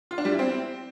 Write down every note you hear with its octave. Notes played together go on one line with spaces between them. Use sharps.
F4
D4
G3
E4
C4